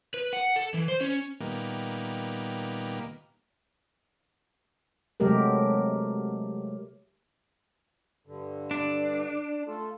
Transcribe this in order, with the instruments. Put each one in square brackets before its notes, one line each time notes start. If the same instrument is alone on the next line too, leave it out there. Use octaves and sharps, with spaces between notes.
[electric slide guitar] B4
F#5
A4
E3
C5
C#4
[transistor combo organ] A#2 D#3 G3 A#3 B3
[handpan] C3 F#3 G#3 A3 G4 A#4
[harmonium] G2 D3
[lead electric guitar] D4
[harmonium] A3 F4 A4